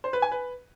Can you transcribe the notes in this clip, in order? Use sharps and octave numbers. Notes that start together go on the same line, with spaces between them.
C5
B4
G#5
B4